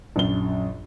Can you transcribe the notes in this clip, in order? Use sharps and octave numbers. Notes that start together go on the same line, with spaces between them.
A#1 F#2 G7